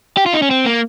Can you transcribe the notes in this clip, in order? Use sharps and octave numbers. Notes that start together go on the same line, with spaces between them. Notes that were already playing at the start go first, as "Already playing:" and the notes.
G4
F4
D#4
C#4
C4
A#3